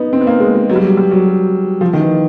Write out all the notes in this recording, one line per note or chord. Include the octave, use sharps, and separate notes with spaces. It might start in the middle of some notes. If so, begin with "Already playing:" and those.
Already playing: B3 D#4
C4
B3
A#3
G#3
G#3
F#3
G3
F#3
G3
F#3
F3
D#3
E3